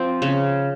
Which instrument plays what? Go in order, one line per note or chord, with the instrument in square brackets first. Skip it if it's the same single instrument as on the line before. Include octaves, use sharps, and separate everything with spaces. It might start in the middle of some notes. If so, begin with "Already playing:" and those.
Already playing: [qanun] F3 C4
C#3